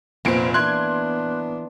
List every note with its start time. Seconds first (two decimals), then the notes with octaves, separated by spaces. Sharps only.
0.25 F1 A#2 B3 C5 D7
0.54 E3 A#3 B3 D4 C6 F#6 G#6